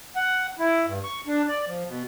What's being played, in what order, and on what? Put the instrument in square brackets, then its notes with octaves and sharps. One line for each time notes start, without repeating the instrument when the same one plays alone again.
[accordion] F#5
E4
G2
C#6
D4
D5
F3
B2